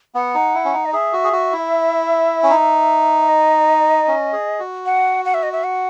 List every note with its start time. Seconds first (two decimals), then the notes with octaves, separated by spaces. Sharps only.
0.15 B3 F#5
0.35 D#4
0.55 E4
0.65 C#4
0.74 D#4
0.85 D#5
0.93 G#4 E5
1.13 F#4
1.24 G#4
1.33 F#4
1.53 E4
2.43 C#4
2.50 D#4
3.28 D#5
4.08 C#4
4.33 G#4
4.60 F#4
4.86 F#5
5.25 F#5
5.34 E5
5.43 D#5
5.52 E5
5.64 F#5